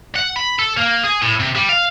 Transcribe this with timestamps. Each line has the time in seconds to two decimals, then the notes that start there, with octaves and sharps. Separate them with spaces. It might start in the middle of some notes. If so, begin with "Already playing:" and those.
0.15 F#5
0.36 B5
0.59 A4
0.77 A#3
1.04 G#4
1.22 A2
1.40 C3
1.56 G3
1.69 F5